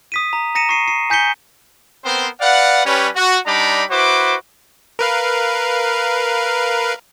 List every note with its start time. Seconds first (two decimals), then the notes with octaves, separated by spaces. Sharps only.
0.12 D#6 B6 D#7
0.33 A#5
0.55 A#5 A#6 C#7 D#7 E7
0.69 C#6 C7 D#7
0.88 C7 D#7
1.10 G#5 G6 B6 C#7 G7
2.05 B3 C4 A#4 C5
2.41 B4 D5 F5 F#5
2.86 G3 C#4 B4
3.15 F#4
3.47 G3 D4 D#4 A#5 B5 D6
3.91 E4 F#4 B4 C5 D6
4.99 A#4 B4 F5